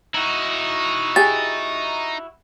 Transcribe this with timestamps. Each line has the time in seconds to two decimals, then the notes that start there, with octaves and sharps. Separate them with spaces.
0.15 D#4 E4 F#4
1.16 G4 G#4 A6